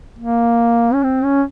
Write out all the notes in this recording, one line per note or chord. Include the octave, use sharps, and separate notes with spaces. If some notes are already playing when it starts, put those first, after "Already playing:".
A#3
C#4
C4
C#4